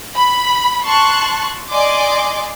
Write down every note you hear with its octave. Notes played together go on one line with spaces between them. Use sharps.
B5
A5 C6 C#6 F#6
D5 D#5 G#5 C6 D6